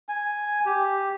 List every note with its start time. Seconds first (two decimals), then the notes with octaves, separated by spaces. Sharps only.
0.09 G#5
0.66 G4